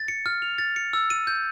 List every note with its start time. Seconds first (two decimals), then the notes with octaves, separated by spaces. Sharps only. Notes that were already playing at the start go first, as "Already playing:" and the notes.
Already playing: A6
0.08 C#7
0.26 F6
0.42 F7
0.58 A6
0.76 C#7
0.93 E6
1.10 D#7
1.27 G6